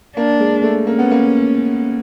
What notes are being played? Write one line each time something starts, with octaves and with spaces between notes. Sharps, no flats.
A#3 D4
G#3
A3
A#3 C#4
B3
A#3